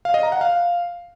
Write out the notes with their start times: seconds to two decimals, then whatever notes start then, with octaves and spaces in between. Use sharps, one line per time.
0.05 F5
0.14 D#5
0.23 A#5
0.32 F#5
0.41 F5